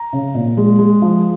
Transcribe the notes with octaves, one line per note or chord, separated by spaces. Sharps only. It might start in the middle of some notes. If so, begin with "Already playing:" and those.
Already playing: A#5
C#3
A#2
G#3
G#3
F3